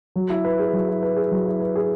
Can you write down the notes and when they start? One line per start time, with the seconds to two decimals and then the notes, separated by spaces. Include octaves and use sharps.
0.16 F#3
0.30 E4
0.45 B4
0.59 G#4
0.73 F#3
0.89 E4
1.03 B4
1.17 G#4
1.31 F#3
1.46 E4
1.60 B4
1.76 G#4